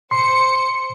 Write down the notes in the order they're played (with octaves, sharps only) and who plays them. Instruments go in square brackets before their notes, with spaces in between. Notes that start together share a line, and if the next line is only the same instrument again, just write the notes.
[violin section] C5 C#7 [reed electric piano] C6